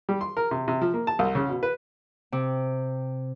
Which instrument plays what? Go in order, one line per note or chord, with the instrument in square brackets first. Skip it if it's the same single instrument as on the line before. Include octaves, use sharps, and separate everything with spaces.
[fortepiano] G3
C6
A#4
C3
C3
F3
A#3
A5
C2
C#3
B2
B4
[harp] C3